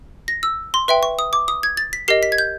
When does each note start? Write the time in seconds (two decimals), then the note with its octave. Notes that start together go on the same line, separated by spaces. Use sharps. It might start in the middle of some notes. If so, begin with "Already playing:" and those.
0.28 A#6
0.43 E6
0.74 C6
0.88 B4 E5 G5 C6
1.03 C#6
1.19 D#6
1.33 D6
1.48 D#6
1.63 G#6
1.77 A6
1.93 B6
2.08 G4 A#4 D#5 C7
2.23 B6
2.32 G#6
2.38 G6